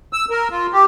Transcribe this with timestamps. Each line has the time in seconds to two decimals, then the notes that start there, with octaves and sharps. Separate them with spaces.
0.13 E6
0.30 A#4
0.51 F4
0.73 G4